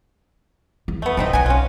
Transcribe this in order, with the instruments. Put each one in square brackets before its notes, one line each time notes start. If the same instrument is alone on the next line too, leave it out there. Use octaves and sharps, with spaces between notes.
[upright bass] E2 D3
[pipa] A3 B3
[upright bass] A#1 D#3 [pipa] A3 C4 D#4
[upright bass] B1 [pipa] F#3 G#5
[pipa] C#4 F4